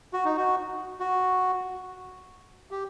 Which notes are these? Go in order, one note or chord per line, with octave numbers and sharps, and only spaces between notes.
F#4
D#4
F#4
F#4
G4